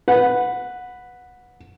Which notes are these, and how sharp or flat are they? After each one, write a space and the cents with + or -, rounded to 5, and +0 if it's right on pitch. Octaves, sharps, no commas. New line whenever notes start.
B4 +0 F#5 -20